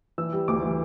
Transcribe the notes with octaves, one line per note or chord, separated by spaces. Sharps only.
E3 E6
G3
D2 D6
E3